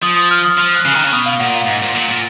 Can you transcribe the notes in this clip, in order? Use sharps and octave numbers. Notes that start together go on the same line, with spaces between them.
F3 D#6
D#6
F6
D#6
F3 F6
F6
F#6
C#3
D#3 F6
C#3
B2 D#6
F5
A#2 F#5
F5
G#2
A#2
A#2
A#2